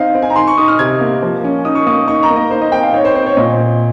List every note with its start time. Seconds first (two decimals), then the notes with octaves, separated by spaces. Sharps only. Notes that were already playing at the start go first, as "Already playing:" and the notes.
Already playing: C4 D#4 F5
0.15 C4
0.22 G#5
0.30 A#5
0.36 D#3 C6
0.47 C#6
0.58 D#4 D#6
0.68 F6
0.79 C3 G#6
1.01 A#3
1.22 F3
1.44 C#4
1.65 D#4 D#6
1.75 C#6
1.86 A#3 D#6
2.08 D#4 C#6
2.23 A#5
2.30 A#3
2.36 D#5
2.51 D#4 C5
2.61 D#5
2.72 C4 G5
2.83 F5
2.93 D#4 C#5
3.05 C5
3.15 C4 C5
3.26 C#5
3.37 A#2 D#5
3.58 C4